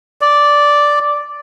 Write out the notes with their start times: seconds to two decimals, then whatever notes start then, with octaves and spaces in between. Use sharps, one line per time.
0.21 D5